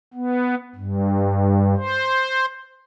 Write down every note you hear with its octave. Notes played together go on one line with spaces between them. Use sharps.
B3
G2
C5